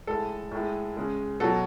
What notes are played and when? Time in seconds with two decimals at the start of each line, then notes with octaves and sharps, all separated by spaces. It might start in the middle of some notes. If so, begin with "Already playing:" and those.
0.07 A2 G#3 A4
0.51 A2 G#3
0.97 C#3 G#3
1.40 B2 F#3 A4